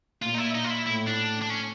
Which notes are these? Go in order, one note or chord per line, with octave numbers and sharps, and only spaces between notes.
A#2 F4
D#4
E4
D#4
F4
E4
A2 E4
D4
D4
C#4